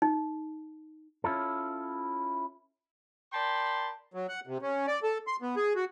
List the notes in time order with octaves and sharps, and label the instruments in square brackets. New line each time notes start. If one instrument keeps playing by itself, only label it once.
[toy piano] D#4
[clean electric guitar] C#4 E4 F4 A4
[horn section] A#4 D5 G5 A5 B5 C6
[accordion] F#3
F#5
C3
C#4
D5
A4
C6
B3
G#4
F#4